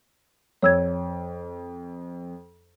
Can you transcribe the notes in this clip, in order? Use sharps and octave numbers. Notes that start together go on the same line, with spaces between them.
F2 C#5 E6 G#6